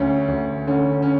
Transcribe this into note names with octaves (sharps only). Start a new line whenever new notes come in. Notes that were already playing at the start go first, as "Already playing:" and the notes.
Already playing: D2 C#4
D2
D3 C#4
C#4